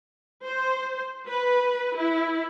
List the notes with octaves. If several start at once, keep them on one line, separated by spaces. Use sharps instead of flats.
C5
B4
E4